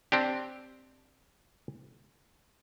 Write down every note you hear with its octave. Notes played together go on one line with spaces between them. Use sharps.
C4 D4 G4